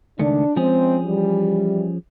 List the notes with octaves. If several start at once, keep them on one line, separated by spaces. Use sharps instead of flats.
C#2 D#3 A3 D4
F3 G#3 C4 C#4 G#4
E3 G3